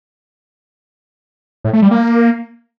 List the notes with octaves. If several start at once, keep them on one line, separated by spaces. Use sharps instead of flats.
A2
A3
G3
A#3